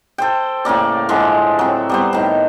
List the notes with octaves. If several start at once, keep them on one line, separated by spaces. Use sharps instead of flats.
A4 C5 G5
A2 C#3 A#3 D5
A2 D3 F3 G#3
F#3 C4
G3 B3 C5
A2 D#3